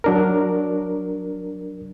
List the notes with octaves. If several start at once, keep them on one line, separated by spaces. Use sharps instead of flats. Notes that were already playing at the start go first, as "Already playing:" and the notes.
F#3 D4 A#4